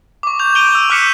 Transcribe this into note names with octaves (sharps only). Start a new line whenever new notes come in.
C#6 D6
G6 F7
G6 D7 D#7 F7 G7
E6
D6 F6 F#6 B6 C#7 E7